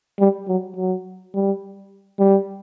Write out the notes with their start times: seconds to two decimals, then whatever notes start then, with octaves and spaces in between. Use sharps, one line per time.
0.19 G3
0.48 F#3
0.76 F#3
1.34 G3
2.19 G3